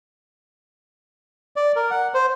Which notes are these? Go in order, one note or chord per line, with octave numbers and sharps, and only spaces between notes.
D5
A#4
F#5
C5